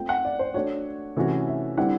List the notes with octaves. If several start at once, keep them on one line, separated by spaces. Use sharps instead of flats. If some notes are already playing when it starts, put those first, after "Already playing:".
Already playing: A3 C4 F4 G5
F#5
D5
C5
A3 D4 F#4 C#5
C3 E3 A3 C#4 F#4
E5
D3 G3 C4 E4 F#5